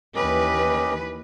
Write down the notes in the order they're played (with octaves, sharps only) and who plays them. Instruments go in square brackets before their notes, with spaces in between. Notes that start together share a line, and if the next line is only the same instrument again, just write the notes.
[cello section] D#2 E3 B4 [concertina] C#4 G4 D#5